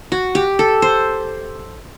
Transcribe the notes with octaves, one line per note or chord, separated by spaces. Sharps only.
F#4
G4
A4
C5